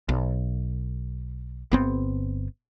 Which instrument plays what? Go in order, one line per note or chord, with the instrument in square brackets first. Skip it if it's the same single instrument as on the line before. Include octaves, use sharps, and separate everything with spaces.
[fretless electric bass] B1
G1 B3 C4